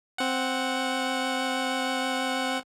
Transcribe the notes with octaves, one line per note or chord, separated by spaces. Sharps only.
C4 F#5